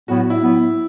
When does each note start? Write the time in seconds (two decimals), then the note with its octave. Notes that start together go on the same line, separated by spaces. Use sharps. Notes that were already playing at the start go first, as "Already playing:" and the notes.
0.08 A2 F#3 B3 F#4
0.20 F#4
0.30 E4
0.42 A2 F#3 B3